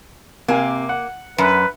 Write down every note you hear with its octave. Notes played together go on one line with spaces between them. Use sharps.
C3 A#3 G#5
F#5
F#2 B4